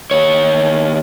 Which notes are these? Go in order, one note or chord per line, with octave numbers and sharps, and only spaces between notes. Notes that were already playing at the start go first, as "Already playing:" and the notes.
D#2 C#5